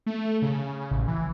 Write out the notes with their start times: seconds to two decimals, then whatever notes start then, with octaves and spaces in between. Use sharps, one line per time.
0.06 A3
0.42 C#3
0.91 A1
1.08 E3